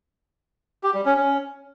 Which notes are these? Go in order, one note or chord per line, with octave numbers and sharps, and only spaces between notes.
G4
G3
C#4
C#4